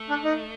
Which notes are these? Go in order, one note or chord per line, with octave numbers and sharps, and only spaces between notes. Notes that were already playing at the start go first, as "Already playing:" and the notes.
Already playing: A3
D4
D#4